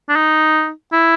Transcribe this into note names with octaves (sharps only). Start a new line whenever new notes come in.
D4
D#4
E4